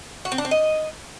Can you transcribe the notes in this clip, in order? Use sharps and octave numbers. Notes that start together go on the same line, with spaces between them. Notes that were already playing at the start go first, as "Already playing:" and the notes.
F#4
C4
D4
C4
D#5